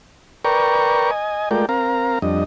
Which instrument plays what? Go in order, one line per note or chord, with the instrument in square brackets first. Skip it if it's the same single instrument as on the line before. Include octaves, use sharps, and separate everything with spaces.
[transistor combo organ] A#4 B4 D5 G5 A#5 C#6
D#5 G#5
G#3 A3 F4 A#4 D5 G5
C4 A#4 F5 A#5
F2 G3 D4 D#5